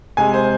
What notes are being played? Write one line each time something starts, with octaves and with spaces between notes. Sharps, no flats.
C3 G#3 G#5
C5